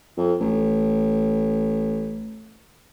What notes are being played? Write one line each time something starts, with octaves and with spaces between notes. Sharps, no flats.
F2
A1